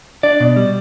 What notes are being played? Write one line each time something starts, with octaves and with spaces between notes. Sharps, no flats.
D4 D5
B2
G3